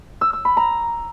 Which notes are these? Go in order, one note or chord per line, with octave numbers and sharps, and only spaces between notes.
E6
E6
B5
A#5